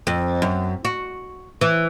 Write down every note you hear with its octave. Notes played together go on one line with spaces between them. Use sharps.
F2
F#2
F#4
E3